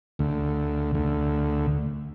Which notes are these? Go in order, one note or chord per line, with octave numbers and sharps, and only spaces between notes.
D2
D2